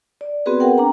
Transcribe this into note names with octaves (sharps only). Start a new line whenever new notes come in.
D5
B3 C4 F#4 G#4 B4
A#4 F#5 G5
D4 A#5